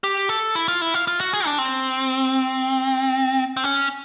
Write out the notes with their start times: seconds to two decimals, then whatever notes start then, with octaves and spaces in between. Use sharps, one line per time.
0.04 G4
0.29 A4
0.55 E4
0.68 F4
0.81 E4
0.94 F4
1.07 F4
1.20 F#4
1.33 G#4
1.46 D4
1.58 C4
3.57 C4
3.64 C#4